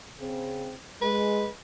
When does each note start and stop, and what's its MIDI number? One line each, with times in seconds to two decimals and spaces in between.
0.17 0.71 49
0.17 0.71 60
1.01 1.44 56
1.01 1.49 71